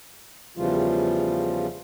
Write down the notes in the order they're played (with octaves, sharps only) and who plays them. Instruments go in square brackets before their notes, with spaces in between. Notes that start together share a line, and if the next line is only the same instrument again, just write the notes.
[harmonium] E2 C#3 E3 F3 G3 F4